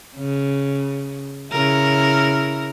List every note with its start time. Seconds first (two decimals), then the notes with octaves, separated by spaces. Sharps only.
0.16 C#3
1.51 C#3 E4 A#4